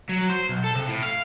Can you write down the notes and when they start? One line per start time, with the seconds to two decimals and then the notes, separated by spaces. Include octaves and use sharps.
0.09 F#3
0.30 C5
0.49 B1
0.64 A4
0.75 C3
0.87 A2
1.02 F5